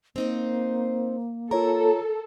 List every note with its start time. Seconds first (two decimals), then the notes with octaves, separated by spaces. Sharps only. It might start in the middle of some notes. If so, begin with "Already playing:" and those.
0.16 A#3 C4 D#4 C5
1.51 F4 A4 A#4 C#5 A#5